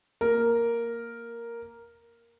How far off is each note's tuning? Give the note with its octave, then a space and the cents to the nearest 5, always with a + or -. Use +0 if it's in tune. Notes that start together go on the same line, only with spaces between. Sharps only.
A#3 +0 A#4 +0